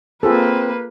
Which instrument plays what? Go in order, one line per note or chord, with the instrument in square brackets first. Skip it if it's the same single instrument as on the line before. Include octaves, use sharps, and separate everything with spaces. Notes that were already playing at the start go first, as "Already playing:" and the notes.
[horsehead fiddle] A#3 B4 [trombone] C4 [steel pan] F4 G#4 A4